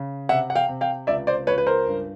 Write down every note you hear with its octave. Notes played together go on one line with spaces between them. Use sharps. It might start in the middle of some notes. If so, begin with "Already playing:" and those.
Already playing: C#3
C3 E5 F#5
F#5
F5 G5
C3
F5 G5
C#2 D5 E5
C5 D5
C#2 B4 C#5
B4
A#4 C5
G2